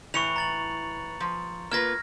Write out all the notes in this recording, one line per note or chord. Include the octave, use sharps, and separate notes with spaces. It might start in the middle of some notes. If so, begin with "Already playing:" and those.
A2 E3 C#6 C#7 F7
A#5 A6 F#7
F3
A#3 F4 B4 F6 G#6 A#6